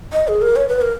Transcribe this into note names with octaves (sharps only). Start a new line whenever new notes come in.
D#5
G#4
A#4
C#5
B4
A#4